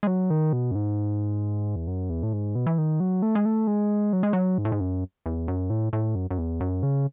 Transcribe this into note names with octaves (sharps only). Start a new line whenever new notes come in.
G#3
F#3
D#3
B2
F#2
G#2
E2
F#2
E2
A2
G#2
B2
E3
D#3
F#3
A3
G#3
A3
G#3
F#3
G#3
F#3
G#2
A2
G#2
F#2
E2
F#2
A2
A2
F#2
F#2
E2
F#2
C#3